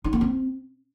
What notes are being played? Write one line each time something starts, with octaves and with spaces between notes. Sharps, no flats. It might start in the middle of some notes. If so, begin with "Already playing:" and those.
D#4
A#3
C4